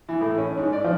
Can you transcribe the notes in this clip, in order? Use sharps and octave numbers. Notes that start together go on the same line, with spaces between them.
E3
A2
C#4
G#2
D5
F3